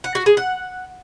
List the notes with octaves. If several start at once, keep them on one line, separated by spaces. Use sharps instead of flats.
F#5
F#4
G#4
F#5